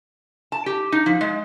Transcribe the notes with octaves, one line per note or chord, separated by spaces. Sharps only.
A5
G4
D#4
F3
G#3